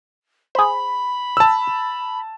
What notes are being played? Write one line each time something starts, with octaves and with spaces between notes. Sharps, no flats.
G#4 C5 B5
A5 E6